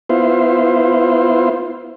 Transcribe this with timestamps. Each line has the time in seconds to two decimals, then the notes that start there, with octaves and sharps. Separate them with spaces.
0.10 B3 E4 F4 C5